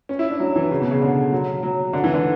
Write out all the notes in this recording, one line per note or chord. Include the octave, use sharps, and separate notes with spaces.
C#4
E4
D4
F#3
E3
C#3
B2
C#3
D3
F#3
F#3
D3
E3
D3